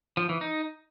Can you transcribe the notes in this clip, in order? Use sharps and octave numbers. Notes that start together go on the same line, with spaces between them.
F3
E3
D#4